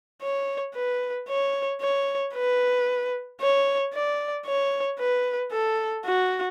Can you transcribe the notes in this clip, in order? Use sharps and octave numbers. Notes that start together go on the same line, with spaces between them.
C#5
B4
C#5
C#5
B4
C#5
D5
C#5
B4
A4
F#4